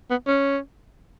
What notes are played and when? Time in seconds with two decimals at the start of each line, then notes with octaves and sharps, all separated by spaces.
0.10 B3
0.27 C#4